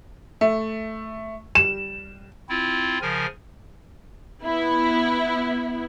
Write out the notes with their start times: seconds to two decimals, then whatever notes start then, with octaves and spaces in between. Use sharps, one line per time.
0.41 A3
1.55 G3 E7
2.49 C4 E4 F4
3.01 C#3 F3 A#4 G#5
4.44 B3 E4